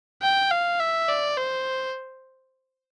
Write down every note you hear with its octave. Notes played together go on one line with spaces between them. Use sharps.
G5
F5
E5
D5
C5